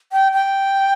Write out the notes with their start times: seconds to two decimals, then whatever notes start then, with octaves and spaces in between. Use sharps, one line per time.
0.12 G5
0.33 G5